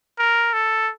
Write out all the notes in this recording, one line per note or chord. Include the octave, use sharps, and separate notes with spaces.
A#4
A4